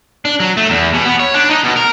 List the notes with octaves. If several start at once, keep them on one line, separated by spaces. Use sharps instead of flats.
D4
F#3
A3
E2
B2
B3
C#5
D4
D#4
B2
A#4